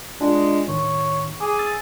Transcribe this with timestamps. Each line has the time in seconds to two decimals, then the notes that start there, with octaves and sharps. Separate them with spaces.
0.21 G#3 D4 F4 D#5
0.68 A2 D#3 C#5
1.41 G#4 D6
1.59 E6 A6